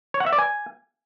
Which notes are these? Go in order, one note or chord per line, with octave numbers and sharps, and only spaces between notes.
C#5
F#5
E5
D5
G#5